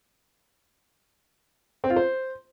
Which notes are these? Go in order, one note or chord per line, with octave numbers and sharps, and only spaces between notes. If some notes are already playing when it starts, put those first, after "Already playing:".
C4
F4
C5